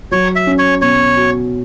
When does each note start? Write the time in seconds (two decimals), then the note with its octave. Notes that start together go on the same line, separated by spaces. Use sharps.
0.11 F#3 C#5
0.35 E5
0.47 C#4
0.58 C#5
0.82 B2 C#5
1.17 F#4